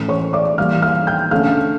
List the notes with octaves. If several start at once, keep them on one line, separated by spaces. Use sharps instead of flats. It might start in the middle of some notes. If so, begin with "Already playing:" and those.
Already playing: A2 E3 A3 C#4
C#5 C#6
D5 D6
E3 G3 A#3 F5 F6
F5 F6
G5 G6
D3 A3 C#4 F5 F6